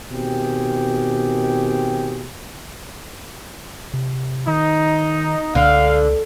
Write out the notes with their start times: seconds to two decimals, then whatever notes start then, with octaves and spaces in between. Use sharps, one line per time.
0.11 B2 D#3 C4 G4 G#4 G5
3.94 C3
4.47 D#3 D#4
5.55 C#2 D3 F5